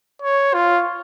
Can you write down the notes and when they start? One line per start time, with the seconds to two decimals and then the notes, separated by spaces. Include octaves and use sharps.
0.22 C#5
0.54 F4